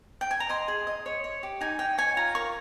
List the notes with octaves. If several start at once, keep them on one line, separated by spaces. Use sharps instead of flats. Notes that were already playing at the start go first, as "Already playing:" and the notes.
G5
G#5
A#5
D#5 C6
G#4
D#5
C#5
C#5
G4
D#4 G#5
D#4 G5
C#5 G#5
F4 A#5
A#4 C#6